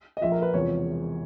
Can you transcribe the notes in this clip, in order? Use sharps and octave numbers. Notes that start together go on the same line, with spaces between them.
D#5
A#1 A#2 F3 E5
A#4
B4
E1 E2 C3 F3 C#5